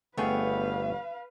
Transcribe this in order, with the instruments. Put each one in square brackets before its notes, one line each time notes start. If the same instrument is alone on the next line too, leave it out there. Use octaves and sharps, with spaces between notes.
[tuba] G1 [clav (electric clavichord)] A3 B3 G#4 [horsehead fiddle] B4 F5 [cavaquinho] C#5 G5